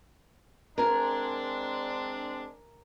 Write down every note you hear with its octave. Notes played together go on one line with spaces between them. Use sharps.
G#3 C4 D4 A#4 G#5